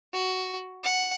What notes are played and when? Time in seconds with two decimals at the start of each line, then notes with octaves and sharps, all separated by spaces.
0.13 F#4
0.83 F#5